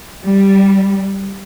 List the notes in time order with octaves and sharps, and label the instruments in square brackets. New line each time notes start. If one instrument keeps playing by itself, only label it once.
[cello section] G3